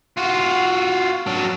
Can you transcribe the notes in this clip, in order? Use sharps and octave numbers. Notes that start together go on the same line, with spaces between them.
F4 F#4
F#3 D4